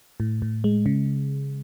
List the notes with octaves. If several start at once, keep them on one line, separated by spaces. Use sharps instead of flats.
A2
A2
G#3
C#3